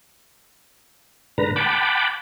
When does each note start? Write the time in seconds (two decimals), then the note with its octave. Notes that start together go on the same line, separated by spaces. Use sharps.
1.38 G#2 D3 B4 A#5
1.56 F#5 G5 A5 B5 D6